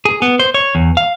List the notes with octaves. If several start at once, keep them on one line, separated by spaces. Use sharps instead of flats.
G#4
B3
C5
C#5
E2
F5